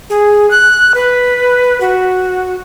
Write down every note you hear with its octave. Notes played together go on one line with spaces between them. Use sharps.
G#4
F#6
B4
F#4